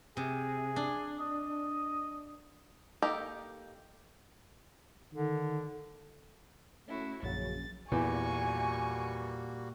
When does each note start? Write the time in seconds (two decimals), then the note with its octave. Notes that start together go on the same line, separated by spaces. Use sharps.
0.17 C3 G#4
0.76 D4
1.20 D#5
3.02 A#3 D#4 G4 A4 A#4
5.14 D3 D#3
6.87 A3 C#4 E4 F#4
7.22 A#1 F#2 C#3 F#3 A6
7.92 E2 A#2 G3 A#3 F#4 G#5 C#6